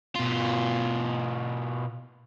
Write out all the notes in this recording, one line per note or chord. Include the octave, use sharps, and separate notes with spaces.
B2 F4